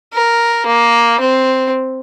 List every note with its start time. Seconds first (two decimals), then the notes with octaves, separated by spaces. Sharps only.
0.13 A#4
0.66 A#3
1.20 C4